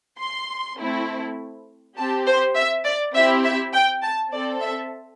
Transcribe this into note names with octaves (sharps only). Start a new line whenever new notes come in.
C6
A3 C4 E4
C4 G4 A5
C5
E5
D5
C4 E4 G4 E5
E5
G5
A5
C4 A4 D5
E5